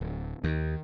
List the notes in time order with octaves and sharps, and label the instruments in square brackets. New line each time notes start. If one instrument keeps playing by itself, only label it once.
[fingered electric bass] D1
[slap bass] D#2 [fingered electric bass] D#3